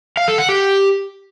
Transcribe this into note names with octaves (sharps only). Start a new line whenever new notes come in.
F5
A4
F#5
G4